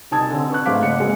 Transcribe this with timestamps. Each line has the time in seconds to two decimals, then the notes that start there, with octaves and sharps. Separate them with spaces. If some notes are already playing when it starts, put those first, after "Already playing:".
0.11 C2 D#4 G#5 A5 D#6 G#6
0.30 D3 C4
0.50 B4 C#6 F#6
0.65 G#2 A3 C5 F5 D6 B6
0.82 F#1 D#5 F#5 C#7
1.00 G#3 A#3 C4 F#4 G#4